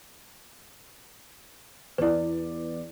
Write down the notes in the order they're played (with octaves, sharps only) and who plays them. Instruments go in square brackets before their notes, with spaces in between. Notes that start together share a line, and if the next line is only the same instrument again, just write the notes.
[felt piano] E2 D5 [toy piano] E4 B4